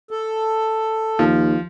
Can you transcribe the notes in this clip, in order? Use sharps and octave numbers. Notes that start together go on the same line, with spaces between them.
A4
D#2 F3